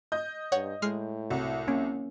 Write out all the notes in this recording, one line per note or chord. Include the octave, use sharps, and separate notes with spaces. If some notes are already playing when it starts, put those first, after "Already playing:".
D#5 G6
G2 C#5 F#5
A2 G#3 F6 C7
C2 F#4
A#3 C#4